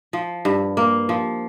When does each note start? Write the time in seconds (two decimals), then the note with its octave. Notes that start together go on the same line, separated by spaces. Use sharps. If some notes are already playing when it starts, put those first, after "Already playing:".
0.13 F3
0.45 G2
0.77 A#3
1.09 F3